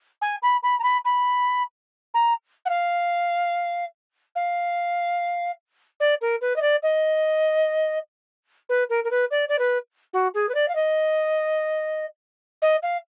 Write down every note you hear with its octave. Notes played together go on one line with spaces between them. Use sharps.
G#5
B5
B5
A#5
B5
B5
A#5
F#5
F5
F5
D5
A#4
B4
D#5
D5
D#5
B4
A#4
A#4
B4
D5
D5
B4
F#4
G#4
B4
D5
F5
D#5
D#5
F5